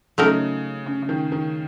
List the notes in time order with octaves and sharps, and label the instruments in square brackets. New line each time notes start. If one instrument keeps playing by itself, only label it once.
[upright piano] C#3 [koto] F#3 A3 D#4 A#4
[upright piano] C#3
C#3
D#3
D#3